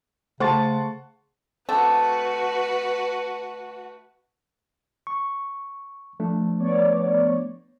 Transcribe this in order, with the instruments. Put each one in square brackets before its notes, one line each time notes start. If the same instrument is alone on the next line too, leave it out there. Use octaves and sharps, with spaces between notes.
[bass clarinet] C#3 [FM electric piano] A3 A6 [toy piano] C5 A5 [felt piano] F#5 C6 C#6
[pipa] D3 A3 C4 [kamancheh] F#4 B4
[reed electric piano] C#6
F3 A3 D4
[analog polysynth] B3 C#5 D5